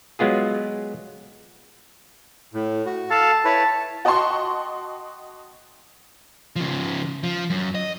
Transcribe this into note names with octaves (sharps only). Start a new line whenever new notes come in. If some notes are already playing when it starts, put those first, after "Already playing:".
F#3 G#3 B3 F4 G#4
A2
F#4
A4 F5 A5
E4 B4 C#5 A5
F#4 D#5 G5 A5 C6 C#6
C#3 F3
F3
F#2
D#5